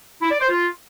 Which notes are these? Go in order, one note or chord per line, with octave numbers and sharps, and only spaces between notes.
E4
D5
C5
F4